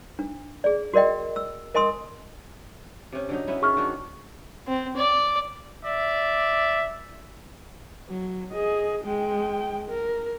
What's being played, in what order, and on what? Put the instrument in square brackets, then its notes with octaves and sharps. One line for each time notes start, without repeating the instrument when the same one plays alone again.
[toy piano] D4
G#4 D5
F#4 A#4 D5 D#5 G5
E6
A#4 D#5 G#5 C6 D#6
[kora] C3 C#4
D3 F#3 D#4
B3 C#4 E4
[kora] D#3 E4 [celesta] G#4 C#6 F6
[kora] D#3 D4 F#4
[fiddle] C4
D5
[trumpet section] D5 E5
[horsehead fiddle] F#3
G#4 D#5
G#3 G5
A#4